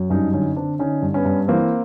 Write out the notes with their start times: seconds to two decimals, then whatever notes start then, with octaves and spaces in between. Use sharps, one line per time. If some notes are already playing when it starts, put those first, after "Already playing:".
Already playing: F#2
0.10 G2 C#4 D#4
0.33 D3 C#4 D#4
0.56 D3 C4 D4
0.79 D3 C#4 D#4
1.02 G2
1.14 B3 C#4
1.25 G2
1.48 E3 A#3 C4